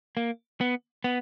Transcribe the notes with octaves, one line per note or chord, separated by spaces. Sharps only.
A#3
B3
B3